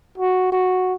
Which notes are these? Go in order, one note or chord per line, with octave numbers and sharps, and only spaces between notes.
F#4
F#4